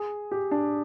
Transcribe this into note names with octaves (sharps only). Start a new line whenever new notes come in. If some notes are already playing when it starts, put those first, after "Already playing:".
Already playing: G#4
G4
D4